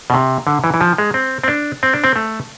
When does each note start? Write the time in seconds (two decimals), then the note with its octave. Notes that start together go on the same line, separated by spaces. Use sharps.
0.10 B2
0.14 C3
0.47 D3
0.64 E3
0.74 E3
0.81 F3
0.98 G#3
1.14 C4
1.44 C4
1.48 D4
1.83 C4
1.94 D4
2.04 C4
2.16 A3